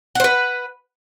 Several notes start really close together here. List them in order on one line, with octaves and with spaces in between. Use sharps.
F#5 C5 B4